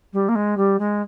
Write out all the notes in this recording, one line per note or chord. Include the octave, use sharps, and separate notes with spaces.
G3
A#3
G#3
G3
G#3